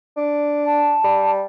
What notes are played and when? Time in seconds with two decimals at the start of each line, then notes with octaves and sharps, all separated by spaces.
0.17 D4
0.66 A5
1.04 G3